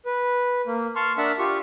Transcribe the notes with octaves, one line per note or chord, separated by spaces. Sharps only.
B4
A#3
A5 C6 C#6 F6
D4 A#4 E5 F#5 A5
F4 G4 C#6